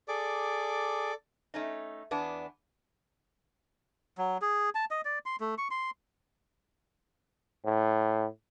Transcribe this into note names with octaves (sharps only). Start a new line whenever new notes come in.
G#4 A4 D5 D6
A3 C#4 D#4
E2 B3 D4
F#3
G#4
A5
D#5
D5
C6
A3
C#6
C6
A2